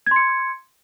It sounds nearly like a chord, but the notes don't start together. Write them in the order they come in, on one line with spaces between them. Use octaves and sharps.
G#6 C6 C#7